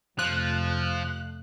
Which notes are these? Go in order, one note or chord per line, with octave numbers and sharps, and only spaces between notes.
F2 C3 F3 A3 F#6